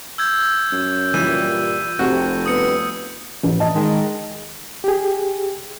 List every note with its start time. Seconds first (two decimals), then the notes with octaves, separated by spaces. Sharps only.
0.18 E6 G6 G#6
0.72 F#2
1.14 G2 A#2 E3 G3 D#7
1.99 F1 C3 C4 F#4
2.46 G2 B3 D#6 C#7
3.43 A1
3.60 D#5 A5
3.74 D#3 G#3
4.84 G4 G#4